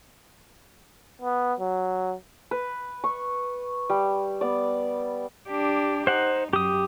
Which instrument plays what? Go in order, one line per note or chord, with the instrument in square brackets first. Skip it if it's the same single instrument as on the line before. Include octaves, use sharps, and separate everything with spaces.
[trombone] B3
F#3
[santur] B4
C#6
G3
B3 D5
[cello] D4 G4
[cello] D#4 [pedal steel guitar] C5 F#5
[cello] F#2 [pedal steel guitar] G4 D#6